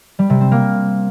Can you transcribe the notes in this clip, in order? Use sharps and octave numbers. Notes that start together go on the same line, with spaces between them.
G3
C3
C4
A#3